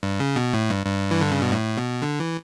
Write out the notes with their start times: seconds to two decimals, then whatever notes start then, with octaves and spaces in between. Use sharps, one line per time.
0.03 G2
0.20 C#3
0.36 B2
0.54 A2
0.70 G2
0.86 G2
1.11 E3
1.21 D3
1.31 C#3
1.42 B2
1.52 A2
1.77 B2
2.02 D3
2.20 E3